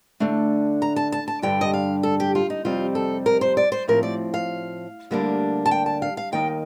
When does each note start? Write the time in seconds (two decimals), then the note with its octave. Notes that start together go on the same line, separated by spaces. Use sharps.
0.20 D3 A3 D4
0.82 A#5
0.96 A5
1.12 A5
1.28 A5
1.42 G2 D3 G3 D4 G5
1.61 D#5
1.73 F5
2.03 A4
2.20 G4
2.35 F4
2.50 D#4
2.65 F2 C3 G3 C4 D#4 F4
2.95 A4
3.26 A#4
3.41 C5
3.57 D5
3.72 C5
3.88 A2 F3 C4 A#4
4.03 D5
4.34 F5
5.11 D2 D3 G3 A#3 D4
5.66 A5
5.71 G5
5.86 A5
6.02 F5
6.17 F5
6.32 D#2 D#3 A#3 D#4 G5